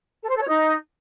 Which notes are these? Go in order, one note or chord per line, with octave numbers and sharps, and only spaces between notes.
A4
C5
A4
C#5
D#4